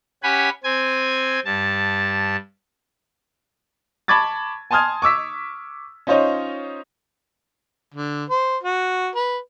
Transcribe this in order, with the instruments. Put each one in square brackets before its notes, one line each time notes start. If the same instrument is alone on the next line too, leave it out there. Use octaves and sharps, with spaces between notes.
[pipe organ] C#4 G4 F#5 G#5 B5
C4 G#5 G#6
G2 A5
[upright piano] A5 B5 C#6 D6 G#6 A6
G#5 A5 C6 D#6 F6 G#6
C#6 D6 E6 B6
C#4 D#4 F4 C5 C#5 D#5
[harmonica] D3
C5
F#4
B4